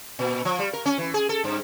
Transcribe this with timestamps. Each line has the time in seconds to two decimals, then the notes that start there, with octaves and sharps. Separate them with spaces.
0.19 A#2
0.45 F3
0.59 G3
0.73 A#4
0.86 C#4
0.98 E3
1.14 G#4
1.29 A4
1.44 G2